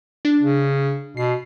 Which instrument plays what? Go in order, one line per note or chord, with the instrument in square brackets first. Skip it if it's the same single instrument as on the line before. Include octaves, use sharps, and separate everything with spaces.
[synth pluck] D4
[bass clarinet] C#3
[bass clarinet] B2 [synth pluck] C7